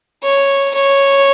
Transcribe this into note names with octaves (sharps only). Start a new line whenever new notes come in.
C#5
C#5